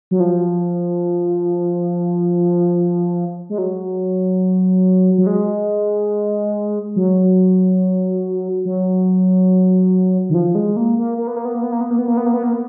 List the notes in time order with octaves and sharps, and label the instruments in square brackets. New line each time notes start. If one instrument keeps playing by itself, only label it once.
[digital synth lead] F#3
F3
G#3
F#3
F#3
G#3
F#3
F#3
D#3
F3
G#3
A#3
A#3
A#3
B3
A#3
B3
A#3
B3
A#3
B3
A#3
B3
A#3
B3
A#3
B3
A#3
B3